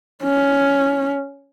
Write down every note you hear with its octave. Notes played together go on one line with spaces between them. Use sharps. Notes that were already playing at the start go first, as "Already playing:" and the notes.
C#4